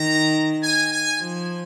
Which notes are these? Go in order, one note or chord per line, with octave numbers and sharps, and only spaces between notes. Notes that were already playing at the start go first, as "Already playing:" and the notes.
Already playing: D#3 A#5
G#5
G#5
F3